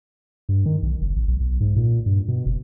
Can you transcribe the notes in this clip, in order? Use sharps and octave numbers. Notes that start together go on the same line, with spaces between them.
G2
D#3
B1
F#1
A1
B1
B1
G#2
A#2
G2
B2
F#1